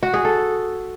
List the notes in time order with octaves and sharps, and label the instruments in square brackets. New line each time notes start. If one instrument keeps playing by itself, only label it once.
[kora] F#4
G#4
A4